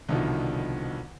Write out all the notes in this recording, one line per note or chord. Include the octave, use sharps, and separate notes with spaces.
C2 B2 D3 D#3 F3